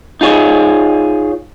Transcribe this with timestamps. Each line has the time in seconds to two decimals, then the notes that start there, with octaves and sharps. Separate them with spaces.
0.21 D#4 F4 G#4 C#5